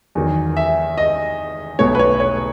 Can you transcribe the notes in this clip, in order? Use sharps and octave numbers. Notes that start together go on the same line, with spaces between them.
E2 D#3 F#3
E5
D#5
B1 B2 A3 C#5
B4
C#5
C#5